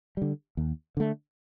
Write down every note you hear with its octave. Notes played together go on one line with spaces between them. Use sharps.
D3 G3
D#2
D3 A3